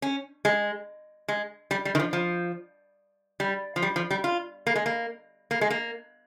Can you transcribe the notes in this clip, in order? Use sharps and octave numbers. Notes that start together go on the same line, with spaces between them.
C#4
G#3
G#3
G3
G3
D#3
F3
F3
G3
F3
G3
F3
G3
F4
A#3
G#3
A#3
A#3
G#3
A#3